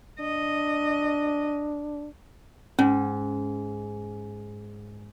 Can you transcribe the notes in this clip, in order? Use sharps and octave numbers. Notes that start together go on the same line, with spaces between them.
D4 D#5
G#2 C#4